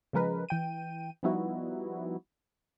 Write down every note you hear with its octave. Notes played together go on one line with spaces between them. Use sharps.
C#3 F3 G#3 A#4 B4
E3 G5 D#7
F3 G3 B3 D#4 E4 F#4